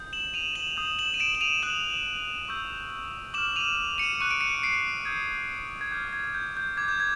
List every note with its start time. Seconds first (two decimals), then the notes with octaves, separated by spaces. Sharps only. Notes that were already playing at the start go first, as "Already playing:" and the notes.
Already playing: D#6 G6
0.13 E7 F#7
0.34 D#7 F7
0.55 E7 F#7
0.77 D#6 G6
0.99 E7 F#7
1.14 D#7
1.20 D7 E7
1.35 F#7
1.41 D#7 F7
1.62 D#6 F#6 E7 F#7
2.48 C#6 E6 G6
3.34 D6 F6 E7 F#7
3.56 D#7 F7
3.98 C#7 D#7
4.21 C#6 F#6 D#7
4.31 D7
4.40 C#7 D#7
4.63 C7 D7
5.05 D#6 G6 G#6
5.81 G#6
5.91 D6 F6 G6
6.13 G#6
6.34 G6
6.57 G6
6.77 D6 G6 G#6
6.88 G6
7.00 G#6